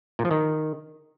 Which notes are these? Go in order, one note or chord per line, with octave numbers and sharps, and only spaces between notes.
A#2
F3
D#3